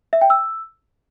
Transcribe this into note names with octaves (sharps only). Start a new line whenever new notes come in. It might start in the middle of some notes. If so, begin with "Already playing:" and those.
E5
G5
E6